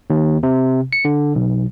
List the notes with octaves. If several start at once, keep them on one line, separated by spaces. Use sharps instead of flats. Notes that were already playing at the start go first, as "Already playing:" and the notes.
D#2
C3
C#7
D3
B1